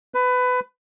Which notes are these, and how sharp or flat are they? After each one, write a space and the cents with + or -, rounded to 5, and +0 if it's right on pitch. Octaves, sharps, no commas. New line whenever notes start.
B4 +20